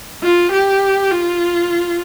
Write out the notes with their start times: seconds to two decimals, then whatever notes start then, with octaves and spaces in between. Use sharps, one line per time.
0.23 F4
0.52 G4
1.11 F4